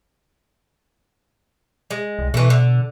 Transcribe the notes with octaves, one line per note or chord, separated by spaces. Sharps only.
G#3
C2
B2 E3 A3
D3